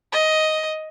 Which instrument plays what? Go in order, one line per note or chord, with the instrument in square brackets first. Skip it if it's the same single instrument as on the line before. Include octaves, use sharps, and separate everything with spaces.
[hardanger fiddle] D#5